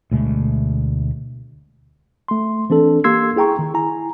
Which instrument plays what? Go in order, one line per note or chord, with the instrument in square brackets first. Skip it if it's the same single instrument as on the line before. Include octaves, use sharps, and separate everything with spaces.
[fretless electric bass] D2 B2 G#3 A3
[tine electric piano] A3 C6
E3 C4 D4 A4
A#3 G4 C6 E6 G#6 C7
E4 G#4 G5 A#5 C#6
D#3
E4 G#5 A#5